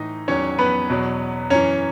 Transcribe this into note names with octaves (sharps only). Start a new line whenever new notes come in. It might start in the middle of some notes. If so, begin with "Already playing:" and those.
Already playing: A2 E3 D#4 D#5
E2 D#3 F#3 C#4 C#5
B3 B4
E2 B2 F#3
F#2 E3 C#4 C#5